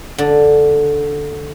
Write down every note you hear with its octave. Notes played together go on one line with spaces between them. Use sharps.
D3